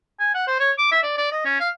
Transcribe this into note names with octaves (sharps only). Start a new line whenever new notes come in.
G#5
F#5
C5
C#5
D6
E5
D5
D5
D#5
C#4
F5